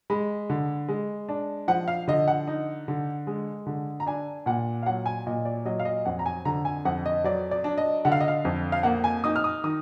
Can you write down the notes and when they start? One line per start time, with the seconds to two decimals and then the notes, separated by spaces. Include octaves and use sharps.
0.10 G#3 B5
0.50 D3
0.88 G#3
1.29 D4
1.68 F3 F#5
1.88 F5
2.08 D3 D#5
2.28 F#5
2.47 D#4
2.88 D3
3.27 G#3
3.66 D3
4.00 A#5
4.06 D4 G#5
4.46 A#2 F#5
4.83 F5
4.86 F#3 F#5
5.06 G#5
5.27 A#2 D#5
5.45 D5
5.65 F#3 D#5
5.80 F5
5.85 D#5
6.06 F2 F#5
6.19 A#5
6.26 G#5
6.45 D3 A#5
6.65 G#5
6.85 F2 F#5
7.06 D#5
7.24 F#3 D5
7.51 D5
7.64 D4
7.78 D#5
8.05 D3 F#5
8.12 F5
8.21 D#5
8.28 F5
8.45 F2
8.72 F5
8.83 A#3 F#5
9.04 G#5
9.24 D#4 D#6
9.36 F6
9.44 D#6
9.64 D#3 D#6